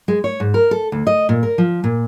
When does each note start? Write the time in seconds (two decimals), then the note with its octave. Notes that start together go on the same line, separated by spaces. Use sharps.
0.08 G#3
0.24 C#5
0.40 G#2
0.54 A#4
0.71 A4
0.92 D2
1.07 D#5
1.29 A#2
1.43 A#4
1.58 F3
1.84 A#2